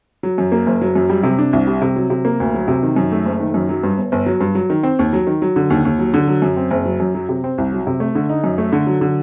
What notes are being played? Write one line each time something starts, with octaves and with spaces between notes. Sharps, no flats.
F#3
F#2
A#3
F#1
F#3
F#2
G3
C3
D4
C2
G3
C3
F#3
C3
A#3
D2
F#3
C3
D#3
F#2
A3
F#1
D#3
F#2
F#3
G2
G1
G1
F#3
G2
F#3
D#3
C4
D#2
F#3
D#3
F#3
D3
D#2
D#2
F#3
D3
F#3
F#2
C4
F#1
F#3
F#2
F#3
C3
C4
C2
F#3
C3
A3
D3
D#4
F#2
A3
D3
F#3
D3